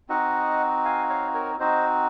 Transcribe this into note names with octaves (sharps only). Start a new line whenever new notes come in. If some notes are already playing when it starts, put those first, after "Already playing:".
C4 D#4 F#4 D#5 F#5
F5 G#5
C#5 F5
A#4 C#5
C4 D#4 F#4 C5 D#5